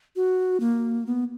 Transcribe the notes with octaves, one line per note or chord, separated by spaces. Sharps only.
F#4
A#3
B3